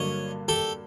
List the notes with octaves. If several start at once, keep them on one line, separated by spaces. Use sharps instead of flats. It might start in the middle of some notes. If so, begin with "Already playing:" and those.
Already playing: G2 D3 F#3 A#3 D4 C#5 D#5
G4 A4